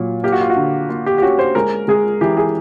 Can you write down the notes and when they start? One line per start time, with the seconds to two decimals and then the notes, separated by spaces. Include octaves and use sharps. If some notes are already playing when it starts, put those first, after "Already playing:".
Already playing: A#2 F#3
0.24 A#3 G4
0.32 F#4
0.41 F4
0.50 F#4
0.56 D3
0.89 A#3 F4
1.06 G4
1.18 G4
1.22 C#4 F#4
1.39 C5
1.55 G#3 A#4
1.88 G#3 G#4
2.21 E3 G4
2.37 G#4